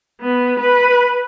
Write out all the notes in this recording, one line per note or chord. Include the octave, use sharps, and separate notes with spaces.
B3
B4